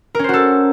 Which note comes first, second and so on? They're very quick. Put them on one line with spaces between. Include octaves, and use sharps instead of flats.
A#4 C#4 C5 F#4 A4